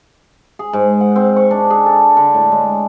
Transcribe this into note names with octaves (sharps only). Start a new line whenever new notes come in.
G#4
G#2
F#5
C4
C#6
D4
G#4
A4
D3
A2
G#3